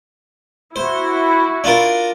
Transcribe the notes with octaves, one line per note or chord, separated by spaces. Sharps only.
E4 F#4 C5
D4 F4 A#4